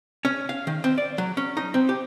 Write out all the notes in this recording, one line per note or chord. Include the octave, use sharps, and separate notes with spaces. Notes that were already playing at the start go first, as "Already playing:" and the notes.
C#4
F5
D#3
C4
D5
F#3
C#4
D#4
C4
G4